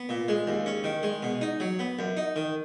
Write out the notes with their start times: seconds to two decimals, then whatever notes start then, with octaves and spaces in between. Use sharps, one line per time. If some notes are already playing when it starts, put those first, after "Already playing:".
Already playing: B3
0.09 A#2
0.28 G#3
0.47 D#2
0.66 C#4
0.84 D#3
1.03 G#3
1.22 B2
1.41 D#4
1.60 F#3
1.79 B3
1.99 F#2
2.17 D#4
2.36 D#3